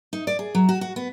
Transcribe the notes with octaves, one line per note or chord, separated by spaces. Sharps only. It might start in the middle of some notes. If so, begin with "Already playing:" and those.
D#4
D5
G#4
F#3
F#4
F#4
B3